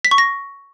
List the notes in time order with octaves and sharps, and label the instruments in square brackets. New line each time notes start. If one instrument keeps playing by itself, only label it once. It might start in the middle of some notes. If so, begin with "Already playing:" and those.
[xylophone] B6
C#6
A#6